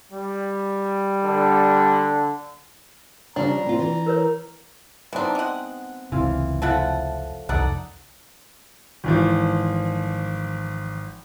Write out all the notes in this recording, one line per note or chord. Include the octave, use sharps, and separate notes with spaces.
G3
D3
C#3 F3 G3 D4 A#5
C4 F4
E3
A#4 B4 C#5
E3 B3 C4 D4 D#4
G#3 F#5
F1 C#2 E3 C4 F4
C#3 F3 A3 E4 A4 F#5
C2 F2 D#4 A4 D5 F#5
G#1 E3 F3